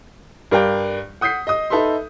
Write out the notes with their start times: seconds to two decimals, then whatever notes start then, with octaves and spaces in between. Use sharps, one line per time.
0.51 G2 A#4 D5 F5 G5
1.21 F#5 D#6 G6 B6 C7
1.47 D#5 D#6
1.70 D#4 A4 B4 E5 C6